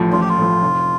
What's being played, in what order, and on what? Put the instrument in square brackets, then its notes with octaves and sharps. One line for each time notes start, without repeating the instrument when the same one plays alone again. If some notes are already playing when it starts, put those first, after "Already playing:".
Already playing: [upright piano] A1 A2 F3
[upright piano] A1 [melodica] F4
[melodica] G4
F4
[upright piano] A2 F3
F1